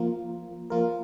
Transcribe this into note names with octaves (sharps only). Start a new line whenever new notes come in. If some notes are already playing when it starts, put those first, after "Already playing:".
Already playing: F3 A#3 F4 A#4
F3 A#3 F4 A#4